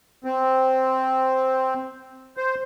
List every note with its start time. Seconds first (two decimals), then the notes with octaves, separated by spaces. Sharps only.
0.24 C4
2.37 C5